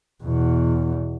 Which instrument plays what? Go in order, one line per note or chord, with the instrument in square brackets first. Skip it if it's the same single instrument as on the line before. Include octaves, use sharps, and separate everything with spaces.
[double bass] E2 B2